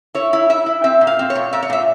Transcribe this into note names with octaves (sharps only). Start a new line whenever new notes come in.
E4 C#5
E4
E4 E5
E4
C4 E5
A#2
F5
C4
C#5
A#2
A#2 E5
C#5
A#2 E5